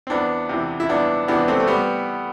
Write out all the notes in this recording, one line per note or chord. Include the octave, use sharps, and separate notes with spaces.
C4
E2 B3 D4
C3 E3
E4
E2 B3 D4
C3 E3 B3 D4
A3 C4
A3
G3 B3